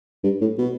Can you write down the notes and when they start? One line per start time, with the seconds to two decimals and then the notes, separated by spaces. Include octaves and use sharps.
0.24 G2
0.41 A2
0.58 B2